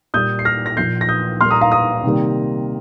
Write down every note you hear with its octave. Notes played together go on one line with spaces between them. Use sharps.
A#2 G3 A#3 D#6 G6
C7
F6 A#6
A#6
A#2 F3 A#3 G6 C7
A#6
D#6 G6
A#2 G3 A#3 C6 F6
A#5 D#6
F5 A#5
A#5 D#6
C3 D#3 G3 A#3